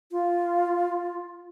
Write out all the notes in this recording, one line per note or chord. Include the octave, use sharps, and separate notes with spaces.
F4